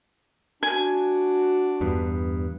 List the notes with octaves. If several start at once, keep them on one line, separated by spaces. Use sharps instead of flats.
D4 F#4 G#5
E2 G2 B3